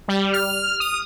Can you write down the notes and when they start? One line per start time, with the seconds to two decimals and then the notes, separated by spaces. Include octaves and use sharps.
0.08 G3
0.33 F6
0.80 D#6